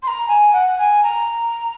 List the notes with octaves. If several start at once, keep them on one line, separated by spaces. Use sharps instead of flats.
C6
A#5
G#5
F#5
G#5
A#5